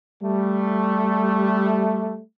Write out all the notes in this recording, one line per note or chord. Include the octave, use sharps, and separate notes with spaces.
G3 A3